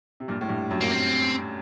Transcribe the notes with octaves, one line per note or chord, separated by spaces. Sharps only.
C3
G2 A#2
A2
G2
F#2
A#3
C4